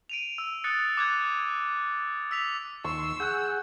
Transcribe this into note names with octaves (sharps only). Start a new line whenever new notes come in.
D7 D#7 F7
E6
D#6 F#6 A6 C#7
D6 F#6 G#6
E6 B6 F7
D#2 C6 C#6 E6
G#4 F#5 F#6 G6